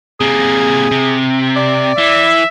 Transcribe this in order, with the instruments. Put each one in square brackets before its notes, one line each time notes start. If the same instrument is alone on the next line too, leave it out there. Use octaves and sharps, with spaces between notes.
[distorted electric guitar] C3 A#3 [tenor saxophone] G#4
[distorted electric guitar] C3
[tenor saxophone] D5
[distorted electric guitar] E3 [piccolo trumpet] E5